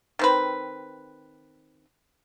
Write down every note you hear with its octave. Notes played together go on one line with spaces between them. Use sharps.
D#3 C4 B4